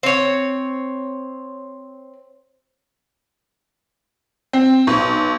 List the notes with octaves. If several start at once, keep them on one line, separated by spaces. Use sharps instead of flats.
C4 C#5
C4
B1